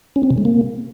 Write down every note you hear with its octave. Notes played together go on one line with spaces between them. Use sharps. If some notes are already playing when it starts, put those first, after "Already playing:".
C#4
C4
C3
G#3
A#3